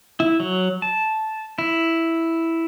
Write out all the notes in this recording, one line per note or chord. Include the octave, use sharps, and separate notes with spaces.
E4
F#3
A5
E4